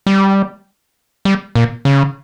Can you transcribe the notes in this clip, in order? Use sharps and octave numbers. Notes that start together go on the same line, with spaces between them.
G3
G3
A#2
C#3